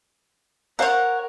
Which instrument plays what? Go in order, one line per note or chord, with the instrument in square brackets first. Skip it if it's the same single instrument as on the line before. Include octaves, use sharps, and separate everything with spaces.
[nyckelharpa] A#4 [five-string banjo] C5 F5 A#5 [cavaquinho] C#5 F#5